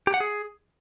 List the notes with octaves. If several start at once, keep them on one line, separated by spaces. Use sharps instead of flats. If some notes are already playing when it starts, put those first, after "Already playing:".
G4
F#5
G#4